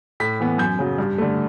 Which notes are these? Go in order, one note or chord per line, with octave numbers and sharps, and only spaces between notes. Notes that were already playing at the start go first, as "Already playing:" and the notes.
A2 B6
E3 B3
F#2 G6
C#3 F#3
G2
D3 A3